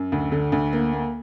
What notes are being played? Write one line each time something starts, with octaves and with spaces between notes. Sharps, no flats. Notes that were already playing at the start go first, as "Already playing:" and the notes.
Already playing: F#2
D2
D3
D2
A#3
A#3